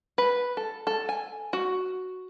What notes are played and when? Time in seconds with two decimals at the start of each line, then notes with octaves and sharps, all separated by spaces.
0.18 B4
0.57 A4
0.87 A4
1.09 G#5
1.53 F#4